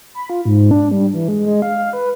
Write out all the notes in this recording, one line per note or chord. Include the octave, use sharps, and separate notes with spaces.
B5
F4
G#2
D4
G3
E3
G#3
G#3
F5
F5
B4